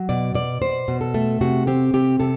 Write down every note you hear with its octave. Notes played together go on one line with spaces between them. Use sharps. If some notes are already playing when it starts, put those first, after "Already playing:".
Already playing: F#3
B2 D5
B2 D5
B2 C5
B2
A4
A3
C3 F#4
C4 G4
C3 G4
C3 A4